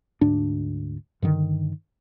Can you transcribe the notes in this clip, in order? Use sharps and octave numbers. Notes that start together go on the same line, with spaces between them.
D2 G#2 D4
G2 D3 D#3